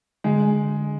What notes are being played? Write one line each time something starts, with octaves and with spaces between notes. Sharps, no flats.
D3 G#3